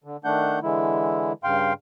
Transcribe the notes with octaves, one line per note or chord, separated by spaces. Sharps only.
D3
D#3 A3 D4 F#5 G6
D3 E3 G#3 E4
G2 C#3 F5 G5 C6